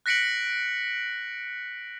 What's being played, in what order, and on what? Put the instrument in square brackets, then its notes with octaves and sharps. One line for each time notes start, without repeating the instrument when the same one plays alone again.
[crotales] F#6 A#6 B6 C#7 D7 F#7